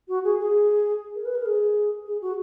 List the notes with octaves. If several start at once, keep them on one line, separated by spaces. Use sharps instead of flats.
F#4
G#4
G#4
A#4
B4
A#4
G#4
G#4
F#4